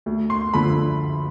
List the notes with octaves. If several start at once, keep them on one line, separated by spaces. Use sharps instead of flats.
D2
C6
D3 F3 A3 B5